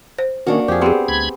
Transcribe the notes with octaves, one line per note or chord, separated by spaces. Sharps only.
C5
D#3 A#3 C#4 D4 F#4
F2 F3 G4 G#4
B3 C4 G4 G#4
D2 B5 G#6